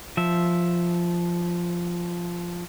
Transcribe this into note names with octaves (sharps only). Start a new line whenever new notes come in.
F3 E5